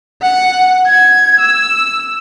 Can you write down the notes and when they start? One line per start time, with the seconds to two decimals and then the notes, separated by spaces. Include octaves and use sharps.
0.22 F#5
0.86 G#6
1.39 E6